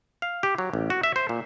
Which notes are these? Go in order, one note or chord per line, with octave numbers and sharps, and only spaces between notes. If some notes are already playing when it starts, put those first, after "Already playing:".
F5
G4
F#3
A1
F#4
E5
C5
A#2